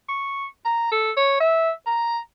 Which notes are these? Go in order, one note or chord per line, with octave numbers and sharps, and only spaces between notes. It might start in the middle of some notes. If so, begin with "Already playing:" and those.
C#6
A#5
A4
C#5
E5
A#5